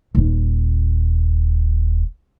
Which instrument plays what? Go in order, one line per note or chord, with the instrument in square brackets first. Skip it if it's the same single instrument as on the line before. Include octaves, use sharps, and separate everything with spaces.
[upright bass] D#1 D#4